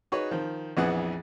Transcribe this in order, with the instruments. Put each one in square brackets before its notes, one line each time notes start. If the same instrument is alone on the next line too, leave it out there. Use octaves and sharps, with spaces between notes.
[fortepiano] D#4 F#4 G#4 B4 C#5
D#3 F3
A#1 F2 E3 B3 G#4 F#5